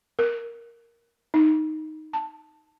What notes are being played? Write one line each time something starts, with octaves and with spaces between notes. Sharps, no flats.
A#4
D#4
A5